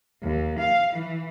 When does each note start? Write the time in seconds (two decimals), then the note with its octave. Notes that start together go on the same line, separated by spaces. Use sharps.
0.22 D#2
0.59 F5
0.94 E3